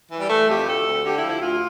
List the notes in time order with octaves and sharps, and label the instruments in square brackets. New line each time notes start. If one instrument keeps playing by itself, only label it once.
[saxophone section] E3
G3
E3 A3
F2 G4
D2 A4
D2
D3 G4
E4
F3
E4
D2 F4